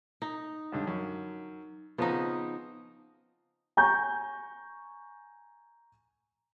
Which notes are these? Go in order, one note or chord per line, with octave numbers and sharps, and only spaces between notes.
D#4
C#2 G2 D3
F#2
C#3 F3 B3 C4 D#4
G#5 A#5 C#6 G6